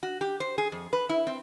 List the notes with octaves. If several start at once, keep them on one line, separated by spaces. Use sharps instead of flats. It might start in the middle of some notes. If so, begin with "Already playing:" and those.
F#4
G4
C5
G#4
F2
B4
E4
C4